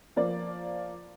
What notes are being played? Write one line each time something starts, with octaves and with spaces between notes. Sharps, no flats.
F3 A#3 D5